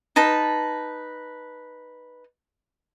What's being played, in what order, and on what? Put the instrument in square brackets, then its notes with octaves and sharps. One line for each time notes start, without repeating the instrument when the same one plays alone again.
[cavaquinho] D#4 B4 A5